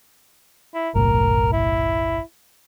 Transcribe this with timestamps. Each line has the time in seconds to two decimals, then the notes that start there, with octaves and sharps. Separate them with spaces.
0.75 E4
0.95 F#1 B1 A2 A#4
1.52 E4